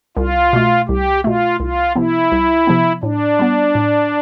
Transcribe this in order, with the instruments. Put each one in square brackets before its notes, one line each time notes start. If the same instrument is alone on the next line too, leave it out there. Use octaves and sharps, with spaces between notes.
[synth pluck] C2 [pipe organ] F4
[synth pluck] B2 A3
[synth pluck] C2 [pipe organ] G4
[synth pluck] B2 A3 [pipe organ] F4
[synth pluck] C2 [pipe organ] F4
[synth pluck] C3 F3 B3 [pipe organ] E4
[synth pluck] C2
C3 F3 B3
[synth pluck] A2 [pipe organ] D4
[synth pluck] G3 B3
A2